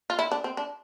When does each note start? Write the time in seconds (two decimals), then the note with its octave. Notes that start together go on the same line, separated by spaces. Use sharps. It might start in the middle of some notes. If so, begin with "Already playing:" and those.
0.10 F4
0.19 E4
0.32 D4
0.44 C4
0.57 D4